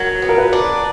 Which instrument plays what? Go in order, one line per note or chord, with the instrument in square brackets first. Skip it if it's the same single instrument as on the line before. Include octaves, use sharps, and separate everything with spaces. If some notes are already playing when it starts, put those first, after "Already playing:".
Already playing: [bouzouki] F#3 [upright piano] A#4
[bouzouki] B3
[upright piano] A#4
B4
[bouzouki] D4